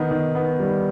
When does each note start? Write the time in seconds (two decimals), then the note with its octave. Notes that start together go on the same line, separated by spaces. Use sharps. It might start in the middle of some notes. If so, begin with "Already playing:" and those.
Already playing: D#3 B3
0.11 D#3
0.35 B3
0.60 G3